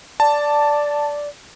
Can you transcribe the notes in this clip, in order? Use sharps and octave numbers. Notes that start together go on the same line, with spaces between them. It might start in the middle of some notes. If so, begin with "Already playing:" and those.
D5 A5